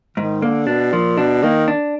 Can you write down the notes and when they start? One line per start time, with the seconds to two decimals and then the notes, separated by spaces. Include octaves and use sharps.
0.17 G#2 D#3
0.41 D3 A#3
0.67 B2 D4
0.92 A#2 F3
1.17 B2 D4
1.43 D#3 A#3
1.68 D4